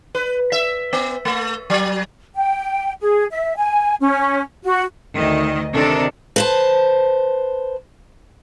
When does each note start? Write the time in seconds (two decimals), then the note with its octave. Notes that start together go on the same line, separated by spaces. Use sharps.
0.15 B4
0.52 E5
0.93 B3
1.25 A3
1.70 F#3
2.35 G5
3.01 G#4
3.31 E5
3.56 G#5
4.01 C#4
4.64 F#4
5.15 D2 D#3 D#5
5.73 C3 D#3 D4 A4 A#4
6.36 B4 C5 A5